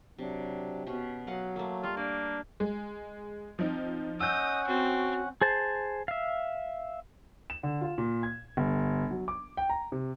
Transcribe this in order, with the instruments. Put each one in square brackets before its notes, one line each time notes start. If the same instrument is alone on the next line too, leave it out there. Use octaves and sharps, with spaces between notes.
[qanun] C3 [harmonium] F#3 D4
[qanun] B2 C#4
[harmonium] F#3 [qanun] D#5 F5 F#5
[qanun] A3 A#3
[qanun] G3 [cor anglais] F4
[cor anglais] A#3 [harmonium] D4 [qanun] D5
[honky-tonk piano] G#3
[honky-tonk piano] F3 D#4 [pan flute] C4
[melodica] C#4 F#5 [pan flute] D#5 [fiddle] D#6 [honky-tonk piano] E6 G6
[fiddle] C4 [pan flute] F#4
[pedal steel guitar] G#4 C5 A5
E5 F5
[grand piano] E7
D3
F4
A#2
G#6
G1
F#3
D6
G5
A#5
C3